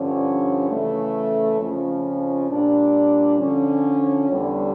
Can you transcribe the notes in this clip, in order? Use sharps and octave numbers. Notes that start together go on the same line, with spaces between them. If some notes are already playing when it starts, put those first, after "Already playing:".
Already playing: G2 D3 F3 C#4
C#3 E3 A3
F2 C#3 F3 C#4
A#2 G3 D4
D3 F3 C#4
E2 D3 G3 C#4